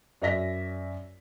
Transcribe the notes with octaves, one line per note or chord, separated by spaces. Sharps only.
F#2 D5 E5 A#6 B6